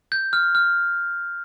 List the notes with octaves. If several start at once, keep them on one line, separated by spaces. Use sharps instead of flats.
G6
F6
F6